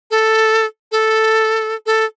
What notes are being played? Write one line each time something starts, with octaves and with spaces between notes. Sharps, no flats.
A4
A4
A4